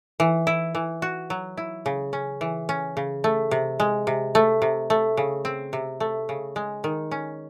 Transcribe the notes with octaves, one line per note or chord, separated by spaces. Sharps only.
E3
E4
E3
F#4
F#3
E4
C#3
C#4
E3
C#4
C#3
A3
C3
G#3
C3
A3
C3
A3
C#3
C4
C3
A3
C#3
G#3
D#3
C#4